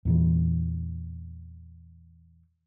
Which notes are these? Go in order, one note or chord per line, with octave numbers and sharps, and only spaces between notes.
E2 A#2 E3